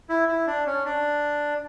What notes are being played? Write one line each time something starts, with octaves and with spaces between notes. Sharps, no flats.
E4
E4
D4
C#4
D4